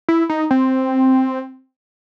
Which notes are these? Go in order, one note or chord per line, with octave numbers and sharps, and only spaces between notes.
E4
D#4
C4